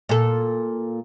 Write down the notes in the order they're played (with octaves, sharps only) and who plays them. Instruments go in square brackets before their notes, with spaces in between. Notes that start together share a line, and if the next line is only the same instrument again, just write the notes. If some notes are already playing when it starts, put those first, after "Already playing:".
[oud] A#2 A4